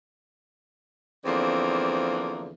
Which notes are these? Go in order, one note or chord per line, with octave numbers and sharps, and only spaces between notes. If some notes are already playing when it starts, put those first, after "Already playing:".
E2 D3 F3 A#3 C4